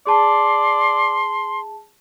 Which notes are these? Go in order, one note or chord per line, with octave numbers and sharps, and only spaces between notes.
G#4 D5 A5 C6